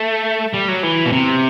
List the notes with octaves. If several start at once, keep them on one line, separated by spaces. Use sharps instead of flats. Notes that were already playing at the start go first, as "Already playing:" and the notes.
Already playing: A3
G3
F#3
E3
B2
C3